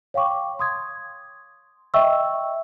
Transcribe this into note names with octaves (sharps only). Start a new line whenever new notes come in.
C#5 F5 G5 C#6 D6
C6 D#6 G#6
D#5 E5 G5 C#6 E6